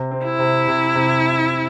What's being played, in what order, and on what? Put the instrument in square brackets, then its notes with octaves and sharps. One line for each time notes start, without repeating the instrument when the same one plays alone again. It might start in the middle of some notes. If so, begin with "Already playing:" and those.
Already playing: [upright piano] C3
C4
[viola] E4
[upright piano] C3
C3
C3